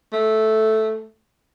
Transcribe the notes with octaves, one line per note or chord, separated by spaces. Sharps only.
A3